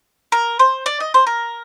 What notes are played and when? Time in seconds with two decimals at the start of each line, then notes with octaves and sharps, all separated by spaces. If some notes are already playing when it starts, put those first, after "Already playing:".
0.32 A#4
0.59 C5
0.86 D5
1.00 D#5
1.14 C5
1.27 A#4